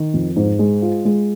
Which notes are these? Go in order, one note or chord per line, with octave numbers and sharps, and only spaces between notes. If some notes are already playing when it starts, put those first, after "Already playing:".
Already playing: D#3
F2
G#2
G#3
F4
G#3